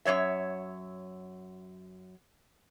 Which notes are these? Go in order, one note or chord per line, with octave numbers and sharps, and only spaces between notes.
F#2 G3 C#5 E5